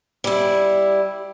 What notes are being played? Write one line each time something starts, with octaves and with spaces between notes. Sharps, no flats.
G3 E4